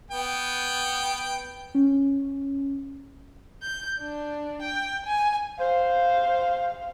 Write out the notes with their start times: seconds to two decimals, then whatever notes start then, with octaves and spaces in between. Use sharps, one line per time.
0.11 B3 G5
1.75 C#4
3.62 G6
4.00 D4
4.62 G5
5.06 G#5
5.59 C5 F5